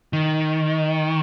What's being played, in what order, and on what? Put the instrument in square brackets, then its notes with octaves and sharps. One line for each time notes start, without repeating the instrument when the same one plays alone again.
[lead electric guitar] D#3